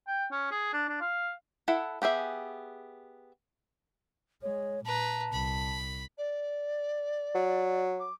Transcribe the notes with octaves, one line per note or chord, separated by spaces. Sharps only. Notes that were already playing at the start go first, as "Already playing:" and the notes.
G5
C#4
G#4
D4
D4
F5
E4 A4 F#5
B3 G4 G#4 E5
G#3 C#5
A#2 B4 A5 A#5
C2 B5
D5
F#3
D6